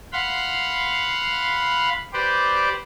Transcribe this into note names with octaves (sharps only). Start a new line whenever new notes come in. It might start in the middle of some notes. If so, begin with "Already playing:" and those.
F5 F#5 B5 C6
G4 B4 C5 D5